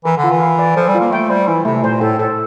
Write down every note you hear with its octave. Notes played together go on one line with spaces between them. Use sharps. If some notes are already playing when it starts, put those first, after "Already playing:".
E3 A#4
D3
F4
E3
F5
D5
F3 A4
G3
F4
A#3
A3 G5
G3 C5
E3 E4
C3 A3
A#2 C5
A2 A4
A2 A4